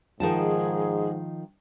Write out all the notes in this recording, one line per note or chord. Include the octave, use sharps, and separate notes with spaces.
G#2 D#3 F3 G#4 A5